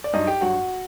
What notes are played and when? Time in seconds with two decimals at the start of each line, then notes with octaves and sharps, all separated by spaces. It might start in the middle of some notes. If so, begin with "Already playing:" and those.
0.04 D5
0.13 G2 F#3 D#4 D#5
0.27 G4 G5
0.41 G2 F#3 F#4 F#5